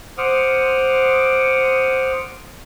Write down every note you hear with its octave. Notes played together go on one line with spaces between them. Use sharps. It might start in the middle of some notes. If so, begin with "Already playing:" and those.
C5 F#5 D6 D#6 F6